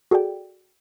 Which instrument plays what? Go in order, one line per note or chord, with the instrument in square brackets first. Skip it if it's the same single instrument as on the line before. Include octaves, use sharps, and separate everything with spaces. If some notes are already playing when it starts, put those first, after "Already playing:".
[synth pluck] F#4 G#4 A4 D5 G5